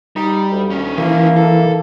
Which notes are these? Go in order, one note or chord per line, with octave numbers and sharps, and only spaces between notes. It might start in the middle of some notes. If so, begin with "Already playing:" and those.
G3 D#4
D2
D#3 C#4
E3 A#3
A4